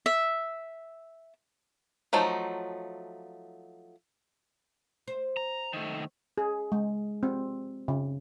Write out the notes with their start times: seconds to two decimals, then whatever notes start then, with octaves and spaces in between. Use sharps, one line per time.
0.06 E5
2.13 F3 F#3 A3 D#4
5.08 C5
5.37 A#5
5.73 D#3 A3
6.38 G#4
6.72 G#3
7.23 C4
7.88 C#3